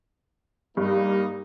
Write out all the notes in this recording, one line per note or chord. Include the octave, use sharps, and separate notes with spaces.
G2 G3 A#3 D#4